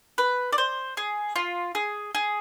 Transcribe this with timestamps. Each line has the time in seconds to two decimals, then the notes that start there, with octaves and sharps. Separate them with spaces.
0.18 B4
0.53 D5
0.58 C5
0.97 G#4
1.36 F4
1.75 G#4
2.15 G#4